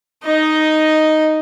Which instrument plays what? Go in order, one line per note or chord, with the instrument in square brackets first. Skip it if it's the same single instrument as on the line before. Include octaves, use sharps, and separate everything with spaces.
[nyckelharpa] D#4 D#5